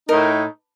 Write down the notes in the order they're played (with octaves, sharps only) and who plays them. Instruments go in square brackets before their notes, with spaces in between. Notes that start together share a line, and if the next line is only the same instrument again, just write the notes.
[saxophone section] A2 A3 D#4 [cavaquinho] A#4